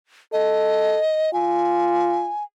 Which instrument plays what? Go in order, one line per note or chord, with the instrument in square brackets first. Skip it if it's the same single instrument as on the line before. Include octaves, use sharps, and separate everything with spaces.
[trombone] A4 [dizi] D#5
[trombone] F4 [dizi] G#5